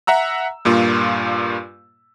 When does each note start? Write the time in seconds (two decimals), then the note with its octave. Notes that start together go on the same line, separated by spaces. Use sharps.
0.07 E5 F#5 A#5 E6
0.65 G2 A#2 A#3 F4